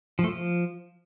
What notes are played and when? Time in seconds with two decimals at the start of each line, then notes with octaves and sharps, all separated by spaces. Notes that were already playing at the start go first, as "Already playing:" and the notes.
0.19 F3
0.24 A3
0.29 F3